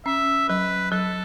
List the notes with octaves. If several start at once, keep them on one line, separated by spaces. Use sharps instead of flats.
C#4 E5
F#3 B4
F#3 A4